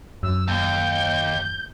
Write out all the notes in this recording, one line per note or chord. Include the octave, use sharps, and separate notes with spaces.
F#2 E6
D#2 G6